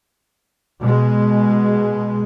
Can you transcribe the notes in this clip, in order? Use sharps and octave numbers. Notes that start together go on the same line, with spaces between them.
B2 G#3